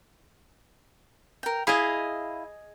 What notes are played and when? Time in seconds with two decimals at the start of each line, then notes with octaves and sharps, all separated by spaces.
1.43 A#4 G5
1.67 E4 G#4 D#5 F5 B5